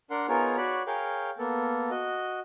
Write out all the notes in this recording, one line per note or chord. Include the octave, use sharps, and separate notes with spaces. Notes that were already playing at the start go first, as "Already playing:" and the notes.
D4 A#4 F#5 C6
B3 D#4 F4 G#4 A#4 C#5
F#4 C#5 D5 B5
G#4 A#4 C#5 F5 G5
A#3 B3 A4
F#4 D#5